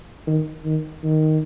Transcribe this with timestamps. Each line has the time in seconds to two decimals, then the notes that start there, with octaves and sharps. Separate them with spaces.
0.27 D#3
0.65 D#3
1.03 D#3